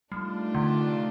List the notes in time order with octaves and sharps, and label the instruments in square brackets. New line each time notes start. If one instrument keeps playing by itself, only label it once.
[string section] C3 D#3 A3 D4 F4 [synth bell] G3
[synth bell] D3